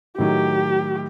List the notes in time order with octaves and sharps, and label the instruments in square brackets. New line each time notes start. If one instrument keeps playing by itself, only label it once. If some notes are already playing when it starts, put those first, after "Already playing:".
[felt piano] A2 D#3 F#3 [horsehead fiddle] G4